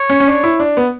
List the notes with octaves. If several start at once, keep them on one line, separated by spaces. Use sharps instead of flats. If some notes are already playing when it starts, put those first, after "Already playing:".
Already playing: C#5
C#4
C#4
D4
E4
D4
B3